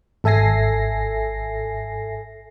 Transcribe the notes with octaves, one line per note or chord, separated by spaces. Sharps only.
G#1 A4 E5 G#5 A#6 C7